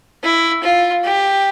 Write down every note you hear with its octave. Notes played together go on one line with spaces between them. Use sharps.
E4
F4
G4